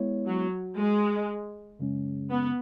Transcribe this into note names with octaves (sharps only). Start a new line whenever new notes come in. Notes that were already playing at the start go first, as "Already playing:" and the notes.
Already playing: G#3 B3 E4 C#5
F#3
G#3
F#2 C#3 G#3 C#4
B3